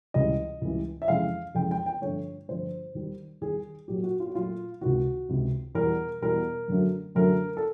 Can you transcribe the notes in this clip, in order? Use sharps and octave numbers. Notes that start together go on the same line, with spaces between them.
C#2 C#3 E3 G3 D#5
C#2 C#3 E3 G3
E5
F2 C#3 E3 G#3 F5
F2 C#3 E3 G#3 G5
G5
G5
G2 D3 F3 A3 C#5
G2 D3 F3 A3 C5
D#2 D#3 G3
D#2 D#3 G3 G#4
A#2 F#3 A3 G4
F#4
F4
F#4
A#2 F#3 A3 F4
C#2 C3 D#3 F#4
C#2 C3 D#3
E2 B2 G3 A#4
E2 B2 G3 A#4
F#2 D3 F#3 A3
F#2 D3 F#3 A3 A#4
A4